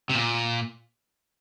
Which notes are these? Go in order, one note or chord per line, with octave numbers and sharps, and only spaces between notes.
C3
A#2